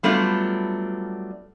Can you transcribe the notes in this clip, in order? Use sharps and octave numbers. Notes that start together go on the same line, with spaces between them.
F#3 G3 A3 B3 D4 F4